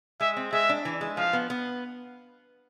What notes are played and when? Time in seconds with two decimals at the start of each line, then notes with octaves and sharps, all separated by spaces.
0.20 G#3 E5
0.37 C4
0.53 G#3 E5
0.69 D4
0.85 E3
1.01 G#3
1.17 F3 F5
1.33 B3
1.50 B3